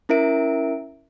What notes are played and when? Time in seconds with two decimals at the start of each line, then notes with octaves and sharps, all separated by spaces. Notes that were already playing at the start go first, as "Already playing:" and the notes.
0.09 C#4 E4 A#4 E5 D7